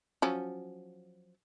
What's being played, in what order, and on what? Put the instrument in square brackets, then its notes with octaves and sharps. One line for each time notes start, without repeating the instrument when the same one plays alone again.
[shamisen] F3 F#3 C#4